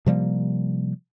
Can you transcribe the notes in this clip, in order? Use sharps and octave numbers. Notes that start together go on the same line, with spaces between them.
C3 F3 G3 A#3